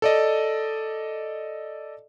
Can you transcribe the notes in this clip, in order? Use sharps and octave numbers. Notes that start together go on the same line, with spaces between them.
A4 D5 D#5